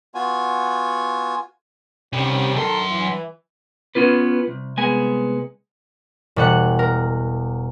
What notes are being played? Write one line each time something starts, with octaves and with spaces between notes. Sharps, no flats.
B3 F4 F#4 G#5
C2 C3 D#3 G3 C#4
D#3 F#3 A4 A#4 C6
E3
B3 C#4 F4 B4
C2
C2 G#3 B3 G#5
E1 G3 F#5 F#6
A#4